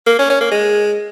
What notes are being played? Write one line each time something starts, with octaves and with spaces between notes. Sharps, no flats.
A#3
C#4
C#4
A#3
G#3